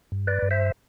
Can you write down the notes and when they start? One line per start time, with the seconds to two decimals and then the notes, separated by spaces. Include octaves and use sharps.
0.12 G2
0.27 B4 D5
0.42 G2
0.51 C5 E5